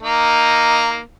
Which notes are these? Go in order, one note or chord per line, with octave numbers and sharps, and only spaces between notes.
A#3 D#4